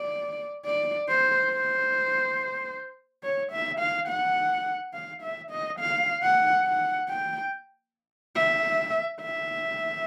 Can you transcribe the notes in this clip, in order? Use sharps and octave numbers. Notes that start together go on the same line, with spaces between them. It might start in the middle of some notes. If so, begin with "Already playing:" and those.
Already playing: D5
D5
C5
C5
C#5
E5
F5
F#5
F5
E5
D#5
F5
F#5
F#5
G5
E5
E5